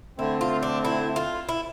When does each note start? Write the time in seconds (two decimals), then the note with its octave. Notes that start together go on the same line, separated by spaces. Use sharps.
0.19 D3 A3 C4 E4
0.41 F4
0.63 D4
0.85 E4
1.16 F4
1.49 E4